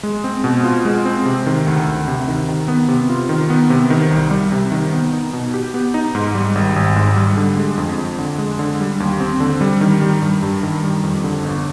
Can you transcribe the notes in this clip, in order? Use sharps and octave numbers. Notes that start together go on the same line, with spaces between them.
G#3
C4
B2
F4
G#3
C4
C3
D#3
D2
D2
C3
D#3
D#3
B3
C3
F4
D#3
B3
C3
D#3
C2
G3
C3
D#3
B3
D#4
B2
G4
B3
D#4
G#2
G3
G#1
G#1
G#2
G3
D3
G#3
F2
F2
D3
G#3
D3
G3
D#2
C4
D3
G3
D#3
G3
G2
G2
D#3
G3
F2
D3
G1